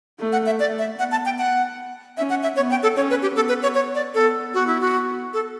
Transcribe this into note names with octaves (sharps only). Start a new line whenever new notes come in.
A3
F#5
E5
A3 D5
E5
B3 F#5
A5
G5
F#5
C#4 E5
F#5
E5
B3 C#5
G5
A4
C#4 C#5
B4
G4
B3 A4
B4
C#5
C#5
D5
B3 A4
B3 F#4
E4
F#4
A4